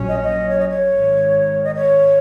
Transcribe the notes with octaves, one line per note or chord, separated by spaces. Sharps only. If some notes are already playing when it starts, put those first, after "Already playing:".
Already playing: A#1 A#2 F#3 C#4
D#5
D#5
C#5
D#5
C#5
G#1 G#2 D#3
D#5
C#5